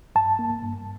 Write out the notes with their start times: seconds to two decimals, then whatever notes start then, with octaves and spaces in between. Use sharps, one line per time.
0.15 G2 A5
0.39 A#3
0.62 G2